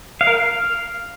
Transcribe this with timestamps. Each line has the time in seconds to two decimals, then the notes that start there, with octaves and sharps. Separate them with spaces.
0.21 F5
0.27 A#4
0.33 F5